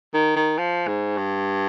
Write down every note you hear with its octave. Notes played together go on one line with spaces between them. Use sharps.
D#3
D#3
F3
G#2
G2